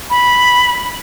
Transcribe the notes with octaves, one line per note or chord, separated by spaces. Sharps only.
B5